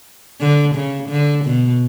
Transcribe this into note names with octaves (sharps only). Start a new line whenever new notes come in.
D3
C#3
D3
B2